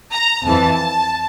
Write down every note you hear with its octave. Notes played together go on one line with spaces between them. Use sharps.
A#5
F2 E3 A5